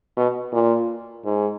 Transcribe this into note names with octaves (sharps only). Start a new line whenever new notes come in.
B2
A#2
G#2